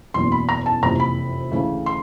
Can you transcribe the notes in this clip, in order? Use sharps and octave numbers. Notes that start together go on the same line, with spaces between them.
F#1 E2 B2 C6
B5
A#5
A5
F#1 F2 C3 E3 A#5
B5
D2 C#3 E3 A3
C6